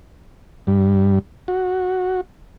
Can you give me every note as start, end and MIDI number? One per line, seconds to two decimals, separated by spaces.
0.67 1.19 43
1.48 2.21 66